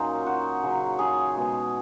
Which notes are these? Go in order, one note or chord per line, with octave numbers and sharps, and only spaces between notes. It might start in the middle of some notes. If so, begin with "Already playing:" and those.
Already playing: A#2 F#3 C#4 D#4 F4
F#4
C#3 F#3
G#4
B2 G#3